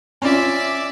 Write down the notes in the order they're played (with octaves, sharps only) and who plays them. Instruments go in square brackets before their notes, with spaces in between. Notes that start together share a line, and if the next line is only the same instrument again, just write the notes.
[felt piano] C#4 F4 [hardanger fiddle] D5 E5